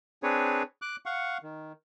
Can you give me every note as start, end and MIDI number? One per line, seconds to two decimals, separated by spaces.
0.23 0.63 60
0.23 0.63 62
0.23 0.63 68
0.23 0.63 71
0.23 0.63 73
0.82 0.96 86
0.82 0.96 90
1.06 1.38 77
1.06 1.38 78
1.06 1.38 85
1.43 1.72 51